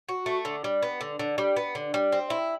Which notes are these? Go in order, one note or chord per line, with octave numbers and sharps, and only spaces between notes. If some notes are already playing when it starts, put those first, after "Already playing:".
F#4
A3
D3
G3
B3
D3
D3
G3
B3
D3
G3
C4
E4